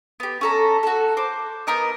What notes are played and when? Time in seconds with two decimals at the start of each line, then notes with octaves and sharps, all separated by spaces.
0.20 B3 G4
0.41 C#4 A4 A#5
0.83 F#4 A4
1.17 C5 D6
1.67 B3 D#4 A#4 D#5